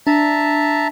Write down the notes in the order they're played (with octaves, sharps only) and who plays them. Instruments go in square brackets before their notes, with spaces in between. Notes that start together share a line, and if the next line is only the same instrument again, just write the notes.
[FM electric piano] D4 [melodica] E5 A5 A#5